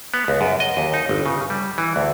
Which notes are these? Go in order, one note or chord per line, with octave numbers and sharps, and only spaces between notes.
B3
C#2
F#2
D#5
D#2
D#4
G1
C#3
G3
E3
D2